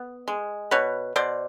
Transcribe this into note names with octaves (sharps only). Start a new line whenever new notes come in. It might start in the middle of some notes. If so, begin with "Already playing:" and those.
Already playing: B3
G#3
B2 B4 C#5
B2 C5 D5